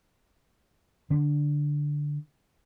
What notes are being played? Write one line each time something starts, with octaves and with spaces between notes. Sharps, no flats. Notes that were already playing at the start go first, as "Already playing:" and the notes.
D3 D4